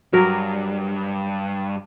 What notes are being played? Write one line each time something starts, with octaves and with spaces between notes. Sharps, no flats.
G2 F#3 A#4